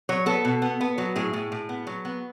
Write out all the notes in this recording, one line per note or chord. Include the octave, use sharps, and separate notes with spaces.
F#3 C#5
B3 A4
B2
B3
B3
F#3
A2 G#4
A2
A2
B3
F#3
B3